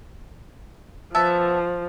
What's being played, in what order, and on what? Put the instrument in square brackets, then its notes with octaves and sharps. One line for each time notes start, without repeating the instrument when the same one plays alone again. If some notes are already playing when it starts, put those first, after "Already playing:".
[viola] F3 [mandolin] B3 E5 A5